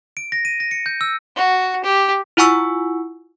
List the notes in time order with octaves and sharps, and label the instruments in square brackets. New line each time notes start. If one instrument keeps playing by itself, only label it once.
[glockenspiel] D7
A#6
D#7
A#6
C#7
G6
E6
[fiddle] F#4
G4
[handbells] E4 F4 F#5 G#5 C#6 E6